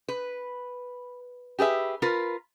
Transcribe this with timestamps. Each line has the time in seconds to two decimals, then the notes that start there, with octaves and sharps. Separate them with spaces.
0.09 B4
1.59 G4 G#4 B4 E5
2.02 F4 A#4 B4